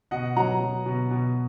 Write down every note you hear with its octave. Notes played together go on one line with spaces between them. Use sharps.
B2 D#5 F#5
F#3 F#5 A#5
F#3
B2
B2